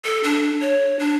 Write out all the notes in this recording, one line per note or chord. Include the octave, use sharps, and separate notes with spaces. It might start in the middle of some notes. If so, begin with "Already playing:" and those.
A4
D4
C#5
D4